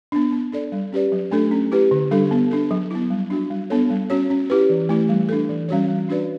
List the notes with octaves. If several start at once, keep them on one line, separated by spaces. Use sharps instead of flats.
B3 D4
B3
D4 A4 D5
G3
C#4 G4 B4 D5
F#3
A3 D4 A4
C#4
E4 G4 B4
D3
G3 D4 A4
B3
D4 A4
F#3
B3 E4
G3
D4 F#4
G3
B3 D4 A4 C#5
G3
C#4 F#4 C#5
C#4
E4 G4 B4
E3
A3 E4
G3
D4 A4
E3
G3 C#4 F#4 C#5
G3
D4 F#4 B4 D5